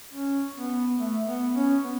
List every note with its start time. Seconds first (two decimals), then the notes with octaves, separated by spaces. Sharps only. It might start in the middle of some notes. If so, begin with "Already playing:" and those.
0.13 C#4
0.56 B3
0.98 A3
1.27 B3
1.55 C#4
1.84 B3